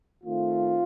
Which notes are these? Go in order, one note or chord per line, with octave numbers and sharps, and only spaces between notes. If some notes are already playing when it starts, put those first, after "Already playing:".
D#3 A3 C4 F4